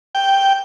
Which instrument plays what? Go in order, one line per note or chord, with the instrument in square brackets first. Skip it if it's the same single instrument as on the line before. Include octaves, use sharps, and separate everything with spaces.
[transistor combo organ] G5